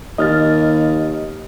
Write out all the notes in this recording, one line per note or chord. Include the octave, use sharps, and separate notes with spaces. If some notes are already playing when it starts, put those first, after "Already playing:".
D#2 D#5 F6 A6